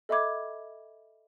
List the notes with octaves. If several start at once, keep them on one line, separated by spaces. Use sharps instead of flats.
A4 D#5 E5 B5 D6 G#6